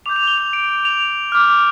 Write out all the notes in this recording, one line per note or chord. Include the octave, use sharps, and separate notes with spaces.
D6 G6 F7
F7
G7
F7
D7
F7
D6 F6